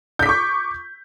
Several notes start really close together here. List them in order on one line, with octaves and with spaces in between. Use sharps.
G6 B6 D6 C#6